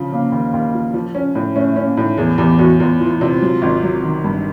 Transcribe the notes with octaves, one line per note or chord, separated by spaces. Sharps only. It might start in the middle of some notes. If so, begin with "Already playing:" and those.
Already playing: C#3 F3
C#3 A#3
D#2
D#2
F3
F3
C#4
A2
A3 C#4
A3 C#4
A#3
A2
D#4
E2 G#4
E2 G4
E2 F#4
E2 F4
E3 F4
C3 F4
F#3
G#1
F#3
D#3
G2